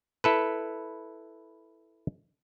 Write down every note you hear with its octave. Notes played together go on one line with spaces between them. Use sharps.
E4 A4 B4